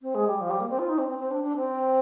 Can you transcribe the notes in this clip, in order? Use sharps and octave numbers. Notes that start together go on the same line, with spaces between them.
C4
G#3
G3
F3
G3
A#3
C4
F4
D#4
C4
C4
C4
D4
D4
C4